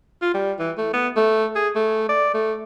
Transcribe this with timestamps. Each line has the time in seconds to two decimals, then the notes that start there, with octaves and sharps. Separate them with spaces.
0.22 F4
0.34 G3
0.59 E3
0.78 A3
0.93 B3
1.17 A3
1.56 G#4
1.75 A3
2.09 D5
2.34 A3